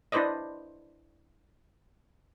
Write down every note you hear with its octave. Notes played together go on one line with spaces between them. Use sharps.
D4 E4 B4 C5 D5 D#5